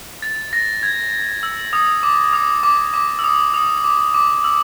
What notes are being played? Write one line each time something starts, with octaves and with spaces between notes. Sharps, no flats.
A6
A#6
G#6
E6
D#6
D6
D#6
D6
D6
E6
D#6
D#6
D6
D6
E6